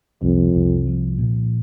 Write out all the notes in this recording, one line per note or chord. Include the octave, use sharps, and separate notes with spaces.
C2 F2
C2
F3
A#2